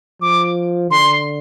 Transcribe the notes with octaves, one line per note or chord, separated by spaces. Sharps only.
F3 D6
D3 C6